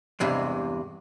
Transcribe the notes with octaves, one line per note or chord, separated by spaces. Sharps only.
E2 G2 C3 G#3